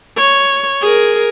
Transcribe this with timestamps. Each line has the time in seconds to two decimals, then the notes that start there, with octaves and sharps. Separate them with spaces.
0.18 C#5
0.82 G#4 A#4